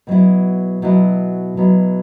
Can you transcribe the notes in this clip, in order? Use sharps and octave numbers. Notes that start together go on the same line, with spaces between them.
B2 F#3 B3 E4
B2 F#3 B3 E4
B2 F#3 B3 E4